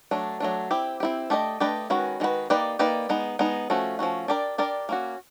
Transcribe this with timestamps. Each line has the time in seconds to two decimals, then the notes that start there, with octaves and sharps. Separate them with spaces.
0.11 F#3 A3 D4
0.40 F#3 A3 D4
0.71 C4 E4 G4
1.00 C4 E4 G4
1.30 A3 D4 G4 B4 D#5
1.60 A3 D4 G4 B4 D#5
1.90 D#3 G#3 C#4 F#4 B4
2.20 D#3 G#3 C#4 F#4 B4
2.50 A#3 D#4 G4 B4 D5
2.79 A#3 D#4 G4 B4 D5
3.09 G#3 B3 D#4
3.39 G#3 B3 D#4
3.70 F3 A3 C#4 F#4
3.99 F3 A3 C#4 F#4
4.28 D4 G4 A#4 D5
4.58 D4 G4 A#4 D5
4.89 A#3 C#4 F#4